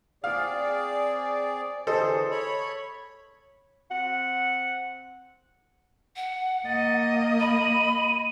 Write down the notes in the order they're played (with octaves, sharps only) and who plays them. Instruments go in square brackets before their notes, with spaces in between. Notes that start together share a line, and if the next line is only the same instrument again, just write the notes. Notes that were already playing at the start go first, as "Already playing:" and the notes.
[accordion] C4 G#4 D5 [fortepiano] F5
[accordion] D3 E3 G#4 [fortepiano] A4 C5 D#5
[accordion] C#5 B5
[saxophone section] C4 F#5
[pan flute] F#5
[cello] A#3 D#5 [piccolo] A6
[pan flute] B5 [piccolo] D#7